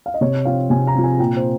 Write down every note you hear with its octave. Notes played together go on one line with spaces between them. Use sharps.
F5
D#5
C3 C#5
F3 C4 F5
C3 G#5
A#5
F3 C4
G#5
A#2 G5
C5